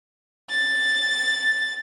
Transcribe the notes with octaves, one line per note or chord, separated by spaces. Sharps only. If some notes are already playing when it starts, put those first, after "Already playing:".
A6